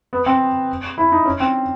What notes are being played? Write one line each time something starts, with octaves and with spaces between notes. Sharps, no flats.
B3
C4
E4
D#4
C#4
C4